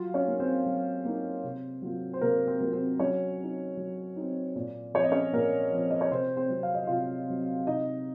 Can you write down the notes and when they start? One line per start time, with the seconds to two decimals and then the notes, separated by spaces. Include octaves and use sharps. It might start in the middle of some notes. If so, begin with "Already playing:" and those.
Already playing: F#3 F4 F5
0.14 C#4 C#5
0.27 A#3 D#4
0.39 C4 C5
0.66 F#3
1.05 A#3 D#4
1.44 C3
1.82 F#3 A#3 F4
2.13 C5
2.21 C3 A#3 A#4
2.47 C4 C5
2.60 F#3 A#3 F4 A#4
2.73 C4 C5
2.99 F#3 C#4 C#5
3.39 C4 D#4
3.77 F#3
4.16 C4 D#4
4.56 A#2
4.94 F3 C4 C#5
5.03 D#5
5.12 C#4 C#5
5.33 A#2 A#3 A#4
5.72 F3 C4
5.91 D#5
6.01 C#5
6.11 C3 C4 C5
6.37 C4 C5
6.50 F#3 C4
6.63 F5
6.75 D#5
6.87 C3 F4 F5
7.28 F#3 C4
7.66 C3 D#4 D#5